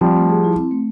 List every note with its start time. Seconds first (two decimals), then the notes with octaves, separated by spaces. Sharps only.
0.01 F3 G3 C4
0.16 A3
0.29 G#4
0.44 E4
0.58 C4
0.71 A3